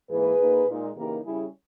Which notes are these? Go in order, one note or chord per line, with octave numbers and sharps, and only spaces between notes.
G#2 E3 A#3 G#4 B4
A#2 A#3 D#4
A#2 G#3 D#4
C#3 E3 A#3 D#4 G4 A#4
C#3 G3 C#4 E4 G#4